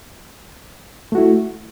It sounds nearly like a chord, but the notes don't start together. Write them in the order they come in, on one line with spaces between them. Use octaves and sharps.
A3 F#4 E4